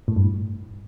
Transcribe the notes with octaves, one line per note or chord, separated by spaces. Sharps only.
A2
G2